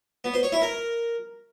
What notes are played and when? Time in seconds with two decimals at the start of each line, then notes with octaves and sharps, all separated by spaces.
0.24 B3
0.34 C5
0.43 C#5
0.52 E4
0.62 A#4